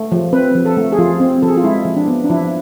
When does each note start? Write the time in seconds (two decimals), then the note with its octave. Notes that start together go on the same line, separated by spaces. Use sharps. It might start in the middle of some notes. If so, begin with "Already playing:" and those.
Already playing: A3
0.12 F3
0.33 C4 B4
0.55 F3
0.66 A4
0.77 A3
0.92 G#4
0.98 F3 F4
1.20 C4
1.42 F3 A4
1.49 G#4
1.57 F4
1.64 G#3 E4
1.85 F3
1.97 D4
2.07 B3
2.24 D4
2.30 F3 E4